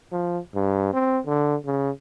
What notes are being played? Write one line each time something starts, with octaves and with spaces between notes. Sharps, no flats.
F3
G2
C4
D3
C#3